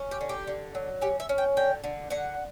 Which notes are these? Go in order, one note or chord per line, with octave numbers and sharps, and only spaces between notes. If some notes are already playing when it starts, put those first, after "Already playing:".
Already playing: C#4
G4
D3
G4
D3
F#3
C#4 G4
E5
C#4
G5
D3 G5
D3
D3 F#5